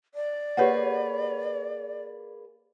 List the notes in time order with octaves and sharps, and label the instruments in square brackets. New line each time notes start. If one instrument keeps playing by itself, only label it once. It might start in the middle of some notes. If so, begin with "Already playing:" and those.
[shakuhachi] D5
[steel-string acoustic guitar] A#3 G#4 B4 [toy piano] G4 C#5 F#5